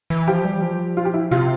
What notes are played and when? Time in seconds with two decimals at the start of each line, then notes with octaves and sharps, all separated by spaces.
0.10 E3
0.28 F3 G4
0.45 G3
0.62 F3
0.97 F4
1.05 G4
1.14 E4
1.31 C3 F4